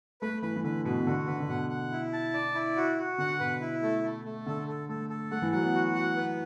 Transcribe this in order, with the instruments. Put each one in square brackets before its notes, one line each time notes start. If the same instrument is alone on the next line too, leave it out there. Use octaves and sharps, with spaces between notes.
[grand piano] A3 [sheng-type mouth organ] B4
[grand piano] E3 [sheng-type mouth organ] B4
[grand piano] E3
[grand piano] D3 [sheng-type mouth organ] B4
[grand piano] B2 [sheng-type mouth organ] B4
[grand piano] B2
[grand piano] D3 [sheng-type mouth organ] F#4
[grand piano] D3 [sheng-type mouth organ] B4
[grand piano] D3
[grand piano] B2 [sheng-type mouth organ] F#5
[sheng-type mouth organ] F#5
E4
A5
D5
E4
F#4
F#4
[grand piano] D3 [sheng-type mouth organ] F#5
[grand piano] B2 [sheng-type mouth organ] B4
[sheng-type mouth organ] E4
A3
A3
A3
[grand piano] D3 [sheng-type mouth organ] A4
[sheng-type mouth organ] A4
[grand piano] A3 [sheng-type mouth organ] A4
[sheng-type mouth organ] A4
[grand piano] A3 [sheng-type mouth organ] F#5
[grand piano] E3
[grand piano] F#3 [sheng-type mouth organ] F#5
[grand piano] B3
[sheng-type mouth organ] F#4
F#5
B3